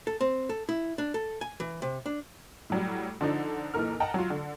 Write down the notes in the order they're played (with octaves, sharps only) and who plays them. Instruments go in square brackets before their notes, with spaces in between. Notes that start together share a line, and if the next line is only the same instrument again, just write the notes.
[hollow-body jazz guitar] A4
C4
A4
E4
D4
A4
G#5
E3
C3
D4
[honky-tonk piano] A2 F#3 G3
D3 F3 D4 D#4
B1 A#2 E3 A4 A#4 F6
D#5 F#5 G5 A5 A#5
F#3 F4
D3